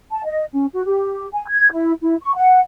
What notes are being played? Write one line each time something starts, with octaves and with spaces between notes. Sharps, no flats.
A5
D#5
C#4
F#4
G4
G#5
G#6
E4
E4
C#6
F#5